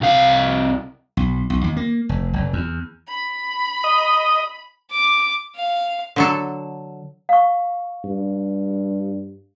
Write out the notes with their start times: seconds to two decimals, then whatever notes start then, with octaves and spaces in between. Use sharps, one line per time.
0.01 C2 F5
1.17 B1
1.50 B1
1.64 D#2
1.77 A#3
2.09 F1
2.33 F1
2.53 E2
3.08 B5
3.84 D#5
4.91 D6
5.56 F5
6.16 D3 F#3 A4
7.29 F5 C#6
8.04 G2